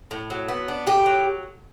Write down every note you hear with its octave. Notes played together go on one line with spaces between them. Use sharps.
A2
F#3
B3
D4
A2 G4
F#3